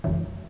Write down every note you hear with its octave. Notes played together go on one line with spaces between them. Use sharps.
G#1 F#2 C#3 E3